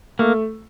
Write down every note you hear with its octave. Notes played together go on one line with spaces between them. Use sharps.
A3 A#3